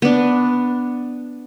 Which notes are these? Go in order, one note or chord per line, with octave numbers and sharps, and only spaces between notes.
B3 D4